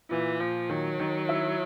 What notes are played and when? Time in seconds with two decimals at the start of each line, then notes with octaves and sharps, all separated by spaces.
0.10 A#2 E3
0.40 A#2 F3
0.70 D#3 F#3
0.99 D#3
1.29 E4